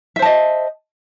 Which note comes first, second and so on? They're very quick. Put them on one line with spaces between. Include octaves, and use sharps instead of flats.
E5 C5 A5 D#5